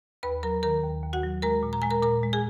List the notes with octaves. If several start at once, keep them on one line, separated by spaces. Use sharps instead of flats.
D#2 B4 B5
F#3 A#4 A#5
D#3 A#4 A#5
D#2
D#2
F#4 F#5
F#3
G#3 A#4 A#5
A#2
A#5
G#3 G#5
A#4 A#5
A#2 A#4 A#5
G#3
G#4 G#5